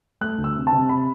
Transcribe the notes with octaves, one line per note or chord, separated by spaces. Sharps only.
A3 F#6
D2
E6
C3
A5
C3
B5